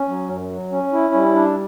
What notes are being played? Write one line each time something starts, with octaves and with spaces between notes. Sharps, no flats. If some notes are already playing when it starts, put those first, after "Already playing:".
Already playing: C#4
F#3
F#2
F#3
C#4
E4
G3
D4